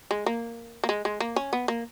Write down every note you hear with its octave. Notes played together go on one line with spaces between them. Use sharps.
G#3
A#3
A#3
G#3
G#3
A#3
C#4
B3
A#3